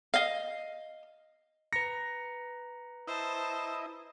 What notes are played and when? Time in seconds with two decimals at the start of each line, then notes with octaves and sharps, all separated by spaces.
0.14 D#5 F5
1.73 B4 A#5 A#6 C#7
3.07 E4 C5 D#5 A5